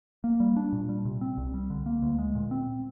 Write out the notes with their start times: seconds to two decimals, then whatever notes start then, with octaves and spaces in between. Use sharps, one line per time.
0.24 A#3
0.40 G3
0.56 D4
0.73 A#2
0.89 G3
1.05 C3
1.21 C4
1.38 C2
1.54 G3
1.70 D3
1.86 A#3
2.02 D2
2.18 G#3
2.35 A#2
2.51 C4